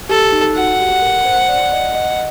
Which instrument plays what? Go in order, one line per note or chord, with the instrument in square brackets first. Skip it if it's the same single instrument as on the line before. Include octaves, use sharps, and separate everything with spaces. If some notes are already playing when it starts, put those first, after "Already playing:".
[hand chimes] G4 [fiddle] A4
[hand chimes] D#4
[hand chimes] F#4 [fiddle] F#5
[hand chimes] G4
A#4
C5
D5
D#5
D#5